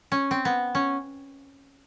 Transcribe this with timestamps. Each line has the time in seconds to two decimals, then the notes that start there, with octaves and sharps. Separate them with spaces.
0.12 C#4
0.31 C4
0.45 B3
0.75 C#4